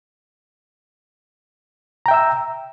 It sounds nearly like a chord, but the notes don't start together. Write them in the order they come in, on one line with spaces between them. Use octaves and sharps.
A#5 G5 E5 E6